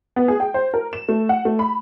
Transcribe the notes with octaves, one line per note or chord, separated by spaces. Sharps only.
B3
G#4
G5
C5
A#4
E7
A3
F#5
A3
B5